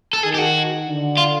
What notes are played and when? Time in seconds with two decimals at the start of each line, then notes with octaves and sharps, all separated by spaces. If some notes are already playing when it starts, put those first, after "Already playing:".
0.13 A4
0.23 D#3 G#4
0.34 G4
0.38 F#4
0.86 D3
1.17 F4